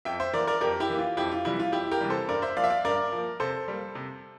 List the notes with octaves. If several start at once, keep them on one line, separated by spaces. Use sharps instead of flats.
F2 E5 G5
C5 E5
E3 A#3 A#4 D5
A#4 D5
F2 G4 A#4
E4 G4
E3 A#3
F4
F2 E4 G4
F4
C3 E3 G3 E4
F4
F2 E4 G4
G4 A#4
C3 E3 G3
A4 C5
G2 A#4 D5
C5 E5
F3 A#3 D5 F5
E5
D5 F5
G2 A#4 D5
F3 A#3
C3 A4 C5
G3 A#3
C3